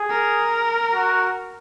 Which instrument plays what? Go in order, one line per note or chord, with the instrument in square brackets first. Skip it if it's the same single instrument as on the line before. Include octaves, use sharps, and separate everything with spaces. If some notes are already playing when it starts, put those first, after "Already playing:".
Already playing: [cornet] G#4
[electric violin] A#4
[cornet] F#4